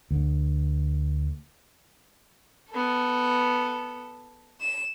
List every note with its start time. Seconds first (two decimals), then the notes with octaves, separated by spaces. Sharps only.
0.11 D2 D3
2.71 B3 A4
4.61 E7